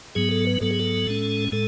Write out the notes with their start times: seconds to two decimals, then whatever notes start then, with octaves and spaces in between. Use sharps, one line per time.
0.15 G#2 F#3 B3 G#4
0.31 A4
0.47 B4
0.61 G#2 F#3 B3 A4
0.71 G#4
0.79 A4
1.07 A2 G#3 C#4
1.52 A2 G#3 A4